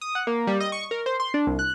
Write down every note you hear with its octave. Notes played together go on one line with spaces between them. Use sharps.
D#6
F#5
A#3
G3
D#5
C#6
A#4
C5
C6
D4
C2
F#6